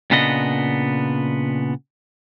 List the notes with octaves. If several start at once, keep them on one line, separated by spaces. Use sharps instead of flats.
A#2 C#3 B3 D4 D#5